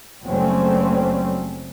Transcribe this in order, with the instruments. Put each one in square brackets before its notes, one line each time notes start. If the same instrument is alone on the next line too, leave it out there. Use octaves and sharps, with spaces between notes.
[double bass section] F#1 F#3 G3 A3 C4 C#4